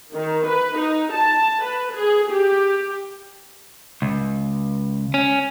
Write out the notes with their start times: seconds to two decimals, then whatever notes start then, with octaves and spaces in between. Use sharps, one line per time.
0.13 D#3
0.46 B4
0.77 D#4
1.13 A5
1.63 B4
1.93 G#4
2.30 G4
4.02 C#2
5.14 C#4